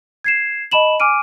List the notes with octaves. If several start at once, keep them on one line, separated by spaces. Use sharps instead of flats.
G#6 C7 E7
D#5 A5 B5 E7 F#7
G#5 D6 F6 D7 D#7